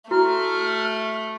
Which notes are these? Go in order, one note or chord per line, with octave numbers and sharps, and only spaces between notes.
A3 E4 F#4 F6